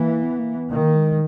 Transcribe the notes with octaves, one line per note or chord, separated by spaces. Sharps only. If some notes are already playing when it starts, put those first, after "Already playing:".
Already playing: E3 A#3
B3
A#3
B3
D#3 A#3
G#3